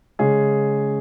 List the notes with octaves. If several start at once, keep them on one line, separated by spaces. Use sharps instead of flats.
C#3 G#3 C#4 G#4